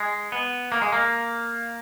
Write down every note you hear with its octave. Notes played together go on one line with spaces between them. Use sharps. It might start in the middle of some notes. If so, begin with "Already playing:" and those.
Already playing: G#3
B3
A#3
G#3
A#3